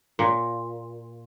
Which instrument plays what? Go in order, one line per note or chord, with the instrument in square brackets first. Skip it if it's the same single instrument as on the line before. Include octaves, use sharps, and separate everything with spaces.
[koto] A#2